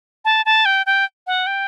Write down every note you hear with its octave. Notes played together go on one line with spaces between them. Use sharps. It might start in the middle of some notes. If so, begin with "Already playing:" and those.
A5
A5
G5
G5
F#5
G5